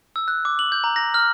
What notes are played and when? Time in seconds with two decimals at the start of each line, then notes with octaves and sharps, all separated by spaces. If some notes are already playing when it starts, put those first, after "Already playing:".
0.16 E6
0.28 F#6
0.45 D6
0.59 F#7
0.72 G6
0.84 A#5
0.96 A#6
1.14 F6